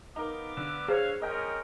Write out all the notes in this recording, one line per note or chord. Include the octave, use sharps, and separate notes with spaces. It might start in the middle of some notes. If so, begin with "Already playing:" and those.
B3 D#4 A#4 F5 D6
D3
G#4 C5 C#5 F5
G#3 C#4 A#4 D#5 G5